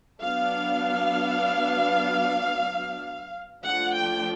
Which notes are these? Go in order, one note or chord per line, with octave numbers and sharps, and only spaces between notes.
F#3 B3 D4 F5
F3 A3 D4 F#5
G5